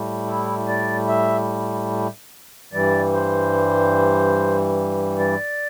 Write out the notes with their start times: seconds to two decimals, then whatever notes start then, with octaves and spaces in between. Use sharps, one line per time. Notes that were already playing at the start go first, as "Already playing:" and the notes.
Already playing: A2 G3
0.26 E4
0.68 D5
1.08 E5
2.73 G2 E3 G3 D5
3.14 C5
5.19 D5